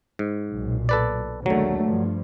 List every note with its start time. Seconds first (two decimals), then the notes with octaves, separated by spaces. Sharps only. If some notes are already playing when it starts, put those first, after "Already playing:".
0.19 G#2
0.52 B1 A#2
0.89 A4 B4 D5
1.46 D#2 D3 F#3 G#3 A3
1.84 G2 F3